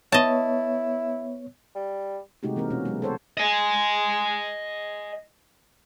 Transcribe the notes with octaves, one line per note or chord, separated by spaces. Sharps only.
B3 E4 C#5 D#5 A5
G3
C3 G#3 A3 D#4 F#4 G4
E3 A#3 C4 A#4
B2 C#4 F#4
F#3 G#3 B3
A4 C5 C#5
D#5 G#5